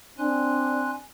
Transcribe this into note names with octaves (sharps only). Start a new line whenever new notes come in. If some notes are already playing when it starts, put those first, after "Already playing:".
C4 D4 G#5 C6 F#6